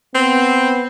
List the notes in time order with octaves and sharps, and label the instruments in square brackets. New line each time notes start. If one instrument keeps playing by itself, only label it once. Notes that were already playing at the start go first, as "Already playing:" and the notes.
[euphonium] B3 [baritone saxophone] C4